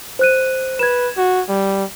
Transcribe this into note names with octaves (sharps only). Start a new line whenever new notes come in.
C5 F#6 D#7
B4 G#6 E7
F#4
G3